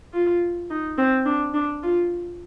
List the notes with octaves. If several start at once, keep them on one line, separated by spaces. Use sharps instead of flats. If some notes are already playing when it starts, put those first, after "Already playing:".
F4
D#4
C4
D4
D4
F4